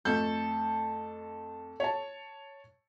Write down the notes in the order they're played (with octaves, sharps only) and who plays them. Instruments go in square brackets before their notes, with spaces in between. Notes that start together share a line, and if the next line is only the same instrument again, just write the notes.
[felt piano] F2 A3 G6 [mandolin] A4
[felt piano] C#5 A5